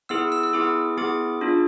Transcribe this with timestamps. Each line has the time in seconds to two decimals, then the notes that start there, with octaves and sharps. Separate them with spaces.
0.09 B3 E4 G#4 E6
0.32 E6
0.43 E6
0.53 B3 E4 G#4 D6
0.97 B3 E4 G#4 D6
1.41 D4 F4 G#4